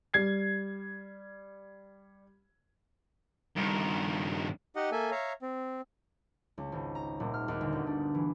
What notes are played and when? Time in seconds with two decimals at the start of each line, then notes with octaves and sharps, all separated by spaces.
0.14 G3 G#6 C7
3.56 G2 D#3
4.76 D#4 G4 D#5 F#5
4.92 A#3 A4 E5 G#5
5.11 C#5 E5 F5 A#5
5.42 C4
6.58 C#2
6.72 G#1
6.95 A#5
7.20 D#1
7.34 F6
7.48 D#2
7.61 G1
7.73 D2
7.87 D4
8.15 E3